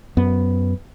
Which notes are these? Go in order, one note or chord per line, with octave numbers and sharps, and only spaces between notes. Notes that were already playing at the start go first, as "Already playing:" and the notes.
F#2 B3